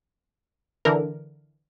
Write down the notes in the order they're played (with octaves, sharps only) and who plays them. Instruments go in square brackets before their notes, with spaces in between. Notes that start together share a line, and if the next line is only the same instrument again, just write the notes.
[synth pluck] D3 E3 A#4